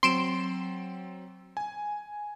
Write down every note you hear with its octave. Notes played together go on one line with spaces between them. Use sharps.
F#3 C4 C6 D7 E7
G#5